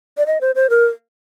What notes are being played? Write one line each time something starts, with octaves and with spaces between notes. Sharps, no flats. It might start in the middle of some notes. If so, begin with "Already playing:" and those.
D5
D#5
C5
C5
A#4